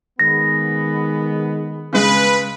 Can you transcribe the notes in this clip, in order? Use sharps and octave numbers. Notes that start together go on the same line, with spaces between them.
D#3 G#3 B3 A#6
C#3 G#3 B4